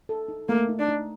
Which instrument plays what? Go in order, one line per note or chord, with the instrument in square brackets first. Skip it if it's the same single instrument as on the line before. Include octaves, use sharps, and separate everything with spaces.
[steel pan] A4
D#4
[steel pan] A3 [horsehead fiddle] A#3
[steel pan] D#4
[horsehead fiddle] D4
[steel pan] D#4